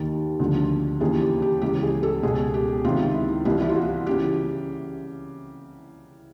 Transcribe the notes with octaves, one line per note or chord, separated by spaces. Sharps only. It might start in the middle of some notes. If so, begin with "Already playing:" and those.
Already playing: D#2 D#3
D2 D3 F3
D#2 C#3 E3 G#4
G4
G4
C#2 C#3 E3 G4
G#4
A4
C#2 B2 G#4
G4
C#2 C3 D#3 F4
E4
C2 C3 E3 E4
E4
F4
F#4
C#3 E3 G4